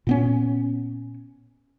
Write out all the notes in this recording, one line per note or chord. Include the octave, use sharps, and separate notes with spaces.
A#2 B3 C#4